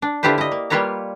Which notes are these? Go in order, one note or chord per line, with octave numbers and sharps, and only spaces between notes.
D4
D3 E4 F4 G4 B4 C5
E4 D#5
A#3
G3 A#3 F4 B4 C#5 A#5